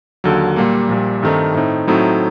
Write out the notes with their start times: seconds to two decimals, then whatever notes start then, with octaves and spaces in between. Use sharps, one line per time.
0.24 D#2 D3 F#3
0.56 A#2 G3 A#3
0.89 A#1 A#2 G3
1.23 G2 D#3 A3 C4 D#4
1.55 A2 A3 C4 D#4
1.87 A2 F#3 A3 C4 D#4